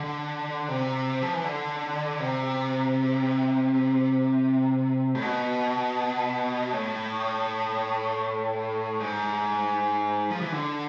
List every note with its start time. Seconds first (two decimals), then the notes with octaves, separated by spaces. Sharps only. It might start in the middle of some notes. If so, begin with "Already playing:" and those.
Already playing: D3
0.68 C3
1.22 F3
1.33 E3
1.44 D3
2.20 C3
5.15 A2
5.22 B2
6.73 A2
9.00 G#2
10.31 F3
10.41 E3
10.52 D3